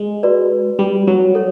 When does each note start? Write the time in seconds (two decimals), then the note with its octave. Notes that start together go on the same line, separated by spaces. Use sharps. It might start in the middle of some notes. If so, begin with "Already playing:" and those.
Already playing: G#3
0.23 F#4 B4 D5
0.79 G3
1.07 F#3
1.35 A4 C#5